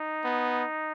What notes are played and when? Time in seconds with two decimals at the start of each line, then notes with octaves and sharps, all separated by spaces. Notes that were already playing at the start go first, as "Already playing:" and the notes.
Already playing: D#4
0.24 B3